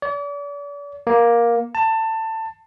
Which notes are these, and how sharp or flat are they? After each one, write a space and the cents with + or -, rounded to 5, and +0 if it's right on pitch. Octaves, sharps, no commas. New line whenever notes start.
D5 -40
A#3 +10
A5 +20